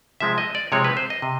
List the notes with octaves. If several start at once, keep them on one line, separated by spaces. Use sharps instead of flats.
C3 F3 G#3 C4 E5
D#5
D5
C3 F3 G#3 C4 C#5
B4
C5
D#5
C3